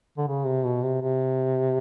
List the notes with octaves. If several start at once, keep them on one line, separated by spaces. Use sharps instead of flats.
D3
C#3
C3
B2
C3
C3